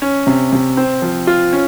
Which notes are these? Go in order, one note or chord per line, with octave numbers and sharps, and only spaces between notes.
C#4
C3
C3
C4
F3
F4
C#4